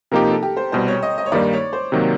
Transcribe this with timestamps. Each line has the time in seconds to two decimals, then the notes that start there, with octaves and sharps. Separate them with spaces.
0.11 C3 F3 A#3 D#4 G4 A#4
0.28 A4
0.43 G4
0.57 C5
0.72 C2 B2 G3 C5
0.88 C#5
1.02 D#5
1.18 D#5
1.26 C#5
1.32 G2 D#3 G3 A#3 D#4 D5
1.53 C#5
1.73 C5
1.92 C3 D#3 F#3 A#3